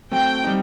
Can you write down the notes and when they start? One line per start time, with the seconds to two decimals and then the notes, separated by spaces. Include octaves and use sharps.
0.11 F#3 A3 C4 G5
0.44 G3 C4 D#4